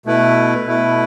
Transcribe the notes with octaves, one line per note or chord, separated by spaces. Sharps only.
B2 A3 E4 B4
B2 A3 E4 B4